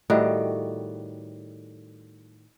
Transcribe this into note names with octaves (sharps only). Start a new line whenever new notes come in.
A2 D#3 G3 F#4